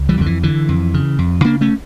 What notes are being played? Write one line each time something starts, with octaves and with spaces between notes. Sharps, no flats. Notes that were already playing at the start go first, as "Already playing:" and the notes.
Already playing: C#2
E3 G3
F2 D3
E3
D3 E3
F2
C#3
F2
C#3 A#3 D4
A3 C#4